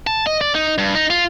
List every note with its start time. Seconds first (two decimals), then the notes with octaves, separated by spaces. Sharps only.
0.07 A5
0.27 D#5
0.41 D5
0.55 D#4
0.78 G2
0.95 D#4
1.10 F4